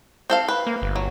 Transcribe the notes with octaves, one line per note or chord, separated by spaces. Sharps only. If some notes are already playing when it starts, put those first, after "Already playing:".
C4 A4 F5
B4
A#3
G1
F#3